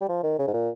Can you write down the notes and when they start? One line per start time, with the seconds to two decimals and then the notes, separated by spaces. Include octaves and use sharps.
0.01 G3
0.09 F3
0.23 D#3
0.38 C#3
0.48 G#2
0.53 A#2